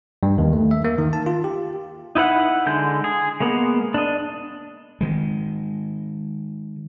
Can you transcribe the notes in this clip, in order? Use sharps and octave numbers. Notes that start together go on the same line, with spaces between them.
G2
D#2
A3
E5
A#3
D#3
A5
F4
G4
D#4 E4 B4 F#5
D3 G#3 G6
G#4
G#3 A#3 B3
D4 D#5
D#3 G#3